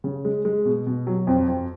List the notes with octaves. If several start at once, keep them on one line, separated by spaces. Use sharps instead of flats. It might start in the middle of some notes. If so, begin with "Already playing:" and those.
C#3
G#3
G#3
B2
B2
F#3
F2
F2